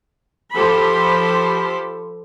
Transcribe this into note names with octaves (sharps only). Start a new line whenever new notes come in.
F3 G4 A4 C5 B5